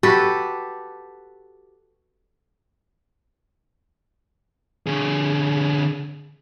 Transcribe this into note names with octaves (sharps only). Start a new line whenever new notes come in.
F#4 G4 A4 B4
D3 G#4